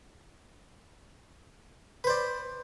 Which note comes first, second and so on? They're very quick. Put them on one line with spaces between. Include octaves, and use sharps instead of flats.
B4 C5 D5